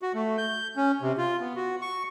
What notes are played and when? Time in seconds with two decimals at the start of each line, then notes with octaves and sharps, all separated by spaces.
0.02 F#4
0.14 A3
0.38 G6
0.76 C#4
1.02 C3
1.18 F4
1.40 B3
1.56 F#4
1.81 C#6